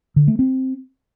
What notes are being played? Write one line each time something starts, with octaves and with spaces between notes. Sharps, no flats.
D3
A3
C4